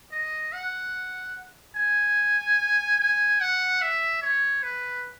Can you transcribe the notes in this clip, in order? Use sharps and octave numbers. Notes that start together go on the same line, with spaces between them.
D#5
F#5
G#5
G#5
F#5
E5
C#5
B4